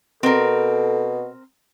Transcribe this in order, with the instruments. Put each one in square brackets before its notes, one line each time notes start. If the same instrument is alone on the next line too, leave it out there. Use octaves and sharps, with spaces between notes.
[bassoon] B2 [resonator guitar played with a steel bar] C4 A#4 [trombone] A4